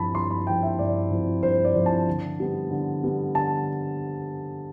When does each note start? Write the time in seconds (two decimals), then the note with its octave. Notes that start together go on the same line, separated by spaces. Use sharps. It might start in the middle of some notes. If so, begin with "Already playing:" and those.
Already playing: G2 F3 C4 E4 A5 B5
0.15 G2 C6
0.31 B5
0.47 F3 C4 E4 G5
0.63 E5
0.79 G2 D5
1.11 F3 C4 E4
1.43 G2 C5
1.65 D5
1.75 F3 C4 E4
1.86 A5
2.07 D3
2.40 G3 B3
2.71 D3
3.03 G3 B3
3.35 D3 A5